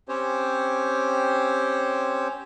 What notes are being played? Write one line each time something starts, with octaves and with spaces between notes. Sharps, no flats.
C4 C#4 G4 C5 C#5